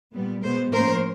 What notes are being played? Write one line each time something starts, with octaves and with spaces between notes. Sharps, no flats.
A#2 G3 B3
B2 G#3 B3 A#4 C5
A2 F3 A#3 C#4 A#4 C5